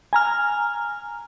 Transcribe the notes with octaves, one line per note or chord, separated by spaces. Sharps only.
G#5 A#5 F6